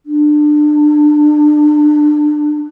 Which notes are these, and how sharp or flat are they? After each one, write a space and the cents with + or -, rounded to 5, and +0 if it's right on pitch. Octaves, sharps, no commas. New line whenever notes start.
D4 +25